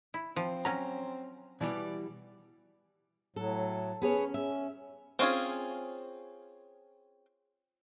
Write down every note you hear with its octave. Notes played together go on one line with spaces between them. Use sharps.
E4
F3 C4
F#3 C#4 A#5
B2 E3 G3 D5
A2 F#3 A4
B3 C#4 G#4 C#5
E5
C4 C#4 F4 G#4